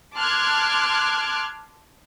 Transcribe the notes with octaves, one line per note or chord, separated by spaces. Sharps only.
A5 C6 D6 F6 F#6 G#6